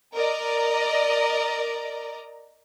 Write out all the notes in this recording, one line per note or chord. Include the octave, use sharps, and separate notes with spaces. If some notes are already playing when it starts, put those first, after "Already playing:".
A#4 D5 D#5 A#5